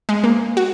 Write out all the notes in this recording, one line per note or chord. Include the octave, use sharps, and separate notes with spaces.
G#3
A#3
F#4